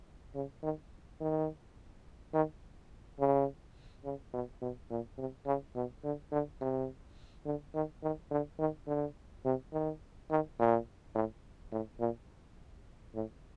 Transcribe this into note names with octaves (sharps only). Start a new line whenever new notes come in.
C#3
D#3
D#3
D#3
C#3
C#3
B2
B2
A#2
C3
C#3
B2
D3
D3
C3
D3
D#3
D#3
D3
D#3
D3
C3
D#3
D#3
A#2
A2
A2
A#2
A2